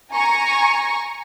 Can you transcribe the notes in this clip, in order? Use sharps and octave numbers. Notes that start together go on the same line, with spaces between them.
G#5 A#5 C#6